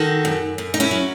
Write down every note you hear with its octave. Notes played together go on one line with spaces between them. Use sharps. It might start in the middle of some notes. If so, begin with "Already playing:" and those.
Already playing: D#3 F#4 A4
F#2
F#2
D#4
C#4 E4
F#3